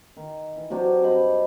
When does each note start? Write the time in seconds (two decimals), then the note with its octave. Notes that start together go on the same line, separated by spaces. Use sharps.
0.17 D#3
0.57 E3
0.70 C3 F#3 C4 D4
1.04 G2 C5 D#5 B5